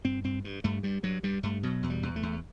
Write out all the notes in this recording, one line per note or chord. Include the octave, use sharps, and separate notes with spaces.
G2 C4
G2 C4
G2
G2 A3
G2 G3
G2 F#3
G2 G3
G2 A3
B2 F#3
E2
G3
E2
A3
E2